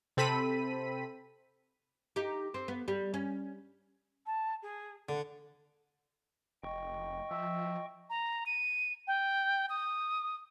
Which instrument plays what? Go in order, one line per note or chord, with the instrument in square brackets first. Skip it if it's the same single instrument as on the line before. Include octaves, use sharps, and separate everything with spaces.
[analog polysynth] C3 C4 A4 B5 B6 D#7
[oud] D#4 G4
C4
B3
G3
C#4
[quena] A5
G#4
[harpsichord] D3 [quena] F#5
[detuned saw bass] F1 [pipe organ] D#5 G5 C#6
[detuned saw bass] F3 [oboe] E5
[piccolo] A#5
D#7
G5
D#6